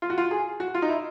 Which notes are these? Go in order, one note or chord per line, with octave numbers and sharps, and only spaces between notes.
F4
F#4
F4
G#4
F#4
F4
D#4
E4